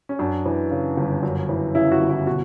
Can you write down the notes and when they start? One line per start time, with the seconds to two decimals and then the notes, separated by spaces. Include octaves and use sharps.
0.09 C#4
0.19 F#2 D4
0.46 E3
0.71 C#3
0.97 G1
1.23 F#2
1.49 E3
1.75 C#3 E4
1.92 F#4
2.01 G1
2.10 E4
2.26 B2 F#4